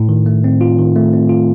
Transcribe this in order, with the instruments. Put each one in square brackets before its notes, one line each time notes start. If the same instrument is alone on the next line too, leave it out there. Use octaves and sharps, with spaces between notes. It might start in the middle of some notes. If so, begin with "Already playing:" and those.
Already playing: [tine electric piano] A2
D#3
A3
C4
F4
D#3
A3
C4
F4